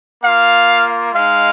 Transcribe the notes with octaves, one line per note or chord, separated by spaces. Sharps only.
A#3 F4 F5
G#3 D#4 F5